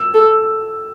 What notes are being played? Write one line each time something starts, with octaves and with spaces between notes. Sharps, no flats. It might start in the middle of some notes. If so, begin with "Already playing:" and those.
Already playing: E6
A4